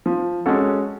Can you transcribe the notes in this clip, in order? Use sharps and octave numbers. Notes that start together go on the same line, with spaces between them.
F3
G#3 C#4 F#4 A4